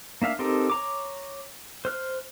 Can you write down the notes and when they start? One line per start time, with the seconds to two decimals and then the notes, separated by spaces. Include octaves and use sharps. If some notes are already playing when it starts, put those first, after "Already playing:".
0.22 A#3 D4 E5 F5
0.39 C4 D#4 G4 A4 A#4
0.70 C#5 A#5 D6
1.85 C5 F6 F#6